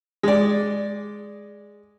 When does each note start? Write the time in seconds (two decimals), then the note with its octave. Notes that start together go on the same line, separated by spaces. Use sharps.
0.23 G#3 D5